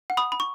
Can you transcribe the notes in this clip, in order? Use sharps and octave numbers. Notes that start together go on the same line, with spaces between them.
F#5
B5 D#6
B5
C#6